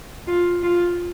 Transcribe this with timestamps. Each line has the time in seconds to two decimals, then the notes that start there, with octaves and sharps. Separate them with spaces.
0.28 F4
0.63 F4